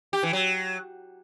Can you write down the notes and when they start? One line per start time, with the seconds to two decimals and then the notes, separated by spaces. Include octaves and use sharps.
0.13 G4
0.23 E3
0.33 F#3